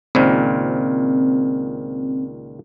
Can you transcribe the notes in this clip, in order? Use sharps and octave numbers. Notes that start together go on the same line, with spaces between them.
C#2 A#2 D#3 C4